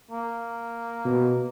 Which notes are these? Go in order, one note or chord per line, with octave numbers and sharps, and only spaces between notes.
A#3
B2